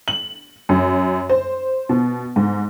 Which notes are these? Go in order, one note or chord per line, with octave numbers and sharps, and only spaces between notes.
F#7
F#2
C5
B2
G#2